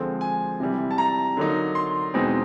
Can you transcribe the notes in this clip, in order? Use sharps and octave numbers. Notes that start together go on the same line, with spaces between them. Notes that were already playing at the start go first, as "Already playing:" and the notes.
Already playing: D3 F3 G#3 C4
G#5
C3 E3 G3
A5
A#5
D3 F#3 A#3 D#4
C6
E2 B2 G#3 C4 D#4